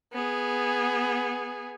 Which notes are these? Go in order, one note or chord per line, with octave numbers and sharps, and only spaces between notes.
B3 G#4